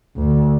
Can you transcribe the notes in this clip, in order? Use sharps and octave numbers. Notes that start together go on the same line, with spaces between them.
D2